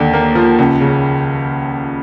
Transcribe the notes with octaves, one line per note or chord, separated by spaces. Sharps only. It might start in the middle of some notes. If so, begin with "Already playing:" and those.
Already playing: D#2 D3
A#3
F3
C#2
C#3